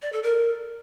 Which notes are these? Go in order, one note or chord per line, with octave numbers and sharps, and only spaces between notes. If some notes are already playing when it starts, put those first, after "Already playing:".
D5
A4
A#4